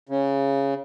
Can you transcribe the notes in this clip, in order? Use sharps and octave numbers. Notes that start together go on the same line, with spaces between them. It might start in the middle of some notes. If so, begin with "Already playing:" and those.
C#3